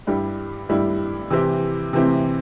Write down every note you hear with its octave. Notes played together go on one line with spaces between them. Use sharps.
G2 G3 E4 G4
G2 G3 E4 G4
C3 E3 C4 E4 G4
C3 E3 C4 E4 G4